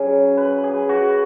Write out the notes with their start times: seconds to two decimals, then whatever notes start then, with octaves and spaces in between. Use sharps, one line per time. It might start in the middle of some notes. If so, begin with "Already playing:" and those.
Already playing: C#3 F#3 G#4
0.37 B4
0.63 G#4
0.89 F#4